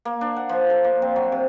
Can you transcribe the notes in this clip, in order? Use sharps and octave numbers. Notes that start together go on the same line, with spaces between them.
A#3
D4
F#5
F3
A4
A#3
C4
F#3
C3